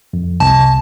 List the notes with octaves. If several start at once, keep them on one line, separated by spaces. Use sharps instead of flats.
F2
C2 A5